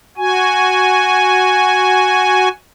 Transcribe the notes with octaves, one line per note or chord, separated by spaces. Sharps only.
F#4 G#5